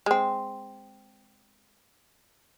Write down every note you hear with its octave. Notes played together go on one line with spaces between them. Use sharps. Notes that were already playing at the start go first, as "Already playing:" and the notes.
G#3 C4